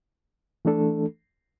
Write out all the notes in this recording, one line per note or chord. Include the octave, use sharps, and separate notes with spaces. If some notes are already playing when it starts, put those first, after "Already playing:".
E3 A3 D4 A4